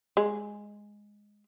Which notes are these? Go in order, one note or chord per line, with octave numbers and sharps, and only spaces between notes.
G#3